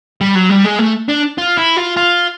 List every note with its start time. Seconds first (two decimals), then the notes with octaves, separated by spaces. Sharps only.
0.21 G3
0.35 F#3
0.50 G3
0.64 G#3
0.79 A3
1.08 D4
1.38 F4
1.57 E4
1.77 F4
1.97 F4